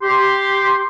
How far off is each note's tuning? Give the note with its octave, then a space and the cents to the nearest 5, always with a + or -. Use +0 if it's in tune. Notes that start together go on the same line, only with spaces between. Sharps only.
G4 +0 C6 +0